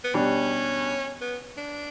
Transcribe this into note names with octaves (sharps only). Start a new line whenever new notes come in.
B3
B2 G3 C#4 D4 G4
B3
D4